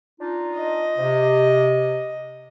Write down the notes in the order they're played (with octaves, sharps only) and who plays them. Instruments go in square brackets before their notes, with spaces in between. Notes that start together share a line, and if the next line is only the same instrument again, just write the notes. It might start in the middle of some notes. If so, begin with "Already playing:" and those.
[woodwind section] D4 D#4 F4
[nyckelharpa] D#5
[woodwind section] C3